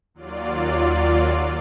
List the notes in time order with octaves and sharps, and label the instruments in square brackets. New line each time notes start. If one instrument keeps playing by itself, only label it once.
[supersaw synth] D#2 F#3 F4 D5